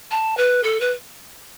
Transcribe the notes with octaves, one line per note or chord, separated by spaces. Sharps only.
A5
B4
A4
B4